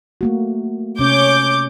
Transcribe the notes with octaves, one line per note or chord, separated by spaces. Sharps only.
A3 A#3 F#4
C3 C#4 C#5 D6 G6